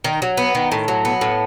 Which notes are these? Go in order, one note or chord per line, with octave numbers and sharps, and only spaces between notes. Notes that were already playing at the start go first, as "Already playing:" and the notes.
D#3
F#3
B3
D#3
A2
F#3
B3
A2